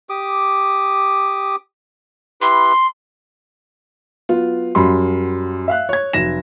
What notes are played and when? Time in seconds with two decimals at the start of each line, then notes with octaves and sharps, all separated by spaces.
0.10 G4 D6 D#6
2.41 E4 G4 B4 C6
4.29 F#3 B3 F4
4.75 F#2 G3 F#4 B5 C6
5.68 E5 F5 F#6
5.89 C#5 G#6
6.13 F1 F#3 A#6 E7